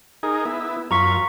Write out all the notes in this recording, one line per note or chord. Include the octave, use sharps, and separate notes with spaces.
D#4 G#4 A#4
B3 E4
F#2 F4 A#5 C#6 B6